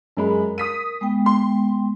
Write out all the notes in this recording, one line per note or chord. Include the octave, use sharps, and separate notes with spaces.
F#2 G#3 A#4 B5
D#6 B6 D#7
G#3 B3 G5
C6